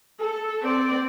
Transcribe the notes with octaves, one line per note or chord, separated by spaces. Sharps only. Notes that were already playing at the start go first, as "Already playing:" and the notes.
A4
C4 D5